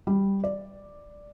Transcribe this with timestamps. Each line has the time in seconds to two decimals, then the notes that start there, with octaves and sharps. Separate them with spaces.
0.07 G3
0.44 D5